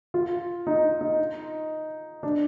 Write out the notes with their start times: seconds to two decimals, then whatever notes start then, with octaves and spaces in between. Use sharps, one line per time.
0.14 F4
0.67 D#4
1.01 D#4
2.23 D4